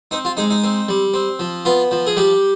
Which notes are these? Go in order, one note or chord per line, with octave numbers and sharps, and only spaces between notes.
C4 D#4
F4
G#3 D#4
D#4
C4
G3
C4
F3
B3 F4
F3
G#4
G3 G4